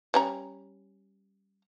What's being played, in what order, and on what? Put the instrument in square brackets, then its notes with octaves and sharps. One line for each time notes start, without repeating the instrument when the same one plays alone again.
[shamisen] G3 C#4 A#5